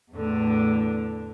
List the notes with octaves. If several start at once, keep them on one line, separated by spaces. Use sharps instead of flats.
E2 A2 D3